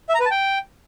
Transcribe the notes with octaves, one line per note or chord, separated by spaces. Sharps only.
E5
A#5
B4
A5
G5